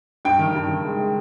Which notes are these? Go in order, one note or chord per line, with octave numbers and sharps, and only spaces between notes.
G2 G5
D#3
G2
D#3
G#3
G#3